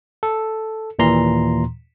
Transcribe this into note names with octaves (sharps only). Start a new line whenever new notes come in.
A4
D#2 A#2 E3 A#5 C6